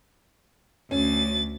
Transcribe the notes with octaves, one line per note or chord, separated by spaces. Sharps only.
D2 C#4 A6